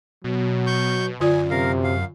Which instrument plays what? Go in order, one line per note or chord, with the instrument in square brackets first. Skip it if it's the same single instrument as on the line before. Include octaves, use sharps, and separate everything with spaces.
[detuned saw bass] B2 [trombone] F#3
[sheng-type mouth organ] C#6 G6
[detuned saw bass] F#2 [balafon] D3 F4 D5 [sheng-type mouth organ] G#5
[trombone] C3 [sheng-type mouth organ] A#4 F5
[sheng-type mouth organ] F5